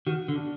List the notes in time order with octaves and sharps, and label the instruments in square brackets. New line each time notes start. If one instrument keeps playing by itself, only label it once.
[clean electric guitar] D#3 [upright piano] F#4
[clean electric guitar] D3
[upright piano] D4